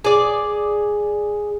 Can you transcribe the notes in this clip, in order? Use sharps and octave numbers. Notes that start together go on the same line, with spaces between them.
G#4 D5